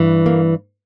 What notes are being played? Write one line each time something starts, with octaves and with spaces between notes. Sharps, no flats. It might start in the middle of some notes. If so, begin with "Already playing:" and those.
Already playing: G2 E3
A#3